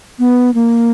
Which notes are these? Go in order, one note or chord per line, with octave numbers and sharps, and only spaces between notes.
B3
A#3